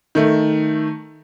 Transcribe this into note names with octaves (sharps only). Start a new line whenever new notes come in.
D#3 A3